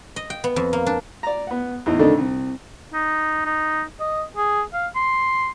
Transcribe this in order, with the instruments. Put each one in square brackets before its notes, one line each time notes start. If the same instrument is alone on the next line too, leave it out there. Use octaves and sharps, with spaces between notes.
[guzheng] D#5
G5
B3
F2
A#3
D4
[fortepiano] D5 A#5
B3 F#5
E2 A2 D#4
F2 D3 D#3 A3 D4 D#4
C2
[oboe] D#4
D#4
D#5
G#4
F5
C6